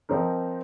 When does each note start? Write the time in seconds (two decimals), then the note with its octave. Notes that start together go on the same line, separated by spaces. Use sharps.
0.09 F3 C4 D#4 A#4